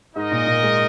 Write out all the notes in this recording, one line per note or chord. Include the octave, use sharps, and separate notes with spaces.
G#2 D#4 A#4 D#5
A#2
A#2
G#3